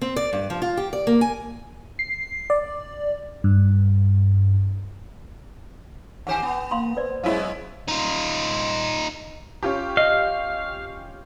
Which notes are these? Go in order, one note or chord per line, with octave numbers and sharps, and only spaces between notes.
C4
D5
G2
F3
F4
G4
D5
A#3
G#5
C7
D5
G2
D#3 G4 C5 F#5 G#5
B3
A#3 F5 B5 C6
B4 C5 D5
F#3 G#3 B3 C#4 E4 F5
D#4 F4
C#4 F4 G4
D#5 F5